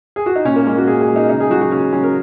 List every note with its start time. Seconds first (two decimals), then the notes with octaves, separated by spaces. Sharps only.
0.16 G#4
0.26 F#4
0.36 D#4
0.45 A#2 C#4
0.56 A#3
0.66 G#3 C#4
0.77 F#4
0.87 A#2 G#4
1.01 G#4
1.08 G#3
1.16 D#4
1.29 C#3 D#4
1.40 G#4
1.50 F#3 F#4
1.61 F#4
1.71 C#3 C#4
1.93 F#3 C#4
2.03 A#4